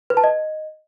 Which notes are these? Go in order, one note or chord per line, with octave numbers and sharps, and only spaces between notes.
B4
A5
D#5